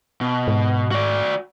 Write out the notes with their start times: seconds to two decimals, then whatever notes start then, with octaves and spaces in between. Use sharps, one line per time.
0.21 B2
0.47 G#2
0.91 F#4 D5